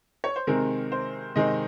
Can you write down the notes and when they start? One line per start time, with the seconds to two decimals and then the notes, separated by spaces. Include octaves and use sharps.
0.24 C#5
0.36 C5
0.47 C3 D#3 G#3 C4 A#4
0.92 C5
1.36 C3 D#3 G#3 C4 D#5